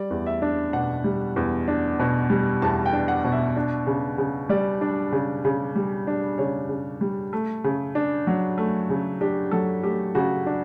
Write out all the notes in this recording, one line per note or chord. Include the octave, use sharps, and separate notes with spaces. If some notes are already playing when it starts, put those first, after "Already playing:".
Already playing: G3 D5
E2
E5
D4
B2 F#5
G3
E2
D4
B2
G3
E2 A5
G5
D4
F#5
B2
E5
D4
C#3
C#3
G3 D5
D4
C#3
C#3
G3
D4
C#3 C#5
C#3
G3
A3
C#3
D4
F#3
A3
C#3
D4 G4
F#3 A4
A3 G4
C#3 F#4
D4